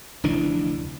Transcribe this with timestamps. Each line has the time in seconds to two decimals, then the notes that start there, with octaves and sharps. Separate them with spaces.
0.24 F1 D2 E3 D4